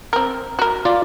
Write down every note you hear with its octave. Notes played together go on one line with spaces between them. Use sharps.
C4 A#4
F#4 A#4
F4 D5